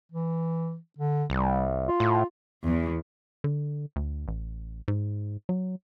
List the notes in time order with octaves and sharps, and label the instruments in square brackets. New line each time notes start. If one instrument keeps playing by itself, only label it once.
[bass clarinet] E3
D3
[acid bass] C2 [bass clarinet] G3
[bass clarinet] F4
[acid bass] A2
[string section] E2
[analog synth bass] D3
D2
A1
G#2
F#3